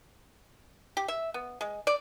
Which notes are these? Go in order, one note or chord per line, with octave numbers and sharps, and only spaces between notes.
G4
E5
B3
G#3
D5